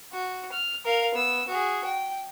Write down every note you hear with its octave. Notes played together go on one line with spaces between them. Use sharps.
F#4
F6
A#4 F5
B3 E6
F#4 G#4
G5